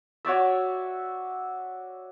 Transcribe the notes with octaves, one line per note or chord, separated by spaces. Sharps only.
F#4 C#5 D5 E5